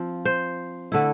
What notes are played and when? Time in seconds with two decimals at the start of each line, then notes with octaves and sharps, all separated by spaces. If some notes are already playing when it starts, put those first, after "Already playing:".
Already playing: F3 C4 F4
0.25 C5
0.92 D3 A3 E4